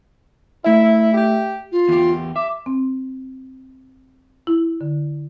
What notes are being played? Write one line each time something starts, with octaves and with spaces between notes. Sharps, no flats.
A3 E4 E5
G4
F4
E2 G4
E5 D6
C4
E4
D3